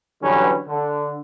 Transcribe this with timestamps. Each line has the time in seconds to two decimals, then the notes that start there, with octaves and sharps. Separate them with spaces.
0.22 D3 E3 F#3 G3 C#4 B4
0.68 D3